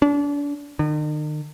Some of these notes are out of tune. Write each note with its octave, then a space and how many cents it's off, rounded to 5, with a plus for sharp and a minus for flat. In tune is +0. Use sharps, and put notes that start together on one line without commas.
D4 -35
D#3 -45